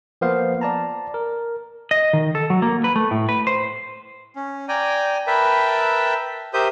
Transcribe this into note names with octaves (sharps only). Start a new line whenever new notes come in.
F3 A#3 B3 C5 F5
D5 A5 A#5
A#4
D#5
D#3
A4
F#3
A#3
B4
A3
A2
B4
C5
C#4
D5 G5 G#5 A#5
A#4 B4 E5 G5 A5 B5
G4 A#4 C5 E5 D#6 G6